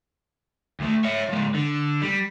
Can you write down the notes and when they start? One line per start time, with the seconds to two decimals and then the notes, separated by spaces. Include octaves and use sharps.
0.80 D2 A3
1.05 C#5 E5
1.29 F3 G#3
1.54 D3
2.02 G3